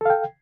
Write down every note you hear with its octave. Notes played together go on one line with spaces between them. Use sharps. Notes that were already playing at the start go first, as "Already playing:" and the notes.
A4 F5 G5